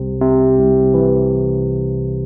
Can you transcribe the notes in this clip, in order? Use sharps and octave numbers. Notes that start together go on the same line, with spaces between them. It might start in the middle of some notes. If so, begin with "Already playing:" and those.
Already playing: C2 C3
C3
C2
E3